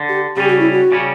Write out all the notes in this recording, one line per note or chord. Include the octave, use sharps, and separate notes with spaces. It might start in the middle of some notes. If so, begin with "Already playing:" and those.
Already playing: D3
G4
C#3 G3 C#4 G4
F#4
E4
F#4
C#3 G3 C#4